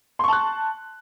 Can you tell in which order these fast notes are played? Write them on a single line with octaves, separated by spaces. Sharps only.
C6 C#6 A5 F#6